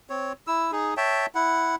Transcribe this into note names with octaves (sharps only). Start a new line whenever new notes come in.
C4 C#5
E4 E6
D#4 G#4
C#5 E5 G5 A5
E4 F#5